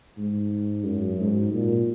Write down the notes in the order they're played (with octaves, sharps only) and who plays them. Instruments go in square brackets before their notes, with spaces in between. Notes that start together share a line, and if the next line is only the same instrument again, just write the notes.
[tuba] G#2
F#2
G#2
A#2